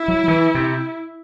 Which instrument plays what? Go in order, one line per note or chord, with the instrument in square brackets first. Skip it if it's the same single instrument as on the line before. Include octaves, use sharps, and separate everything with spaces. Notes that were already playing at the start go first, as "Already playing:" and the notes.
Already playing: [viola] E4
[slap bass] F#3
E3
C3